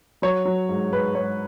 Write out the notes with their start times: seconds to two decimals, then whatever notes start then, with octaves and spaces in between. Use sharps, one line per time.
0.22 F#3 C#5
0.45 F#3
0.69 G#2
0.91 G#2 B4
1.15 G#2 C#5